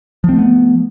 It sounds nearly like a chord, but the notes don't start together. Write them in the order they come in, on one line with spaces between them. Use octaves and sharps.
F3 C4 A3 B3